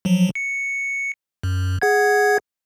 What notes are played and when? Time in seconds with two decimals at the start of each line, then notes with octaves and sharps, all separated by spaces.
0.05 F3 F#3
0.35 C#7
1.43 F#2
1.82 G#4 F#5 G#6